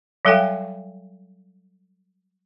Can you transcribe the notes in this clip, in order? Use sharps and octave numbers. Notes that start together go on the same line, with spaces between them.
F#3 G3 A4 F5 G5 G#5